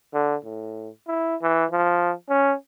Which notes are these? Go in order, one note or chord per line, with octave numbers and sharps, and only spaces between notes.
D3
A2
E4
E3
F3
C#4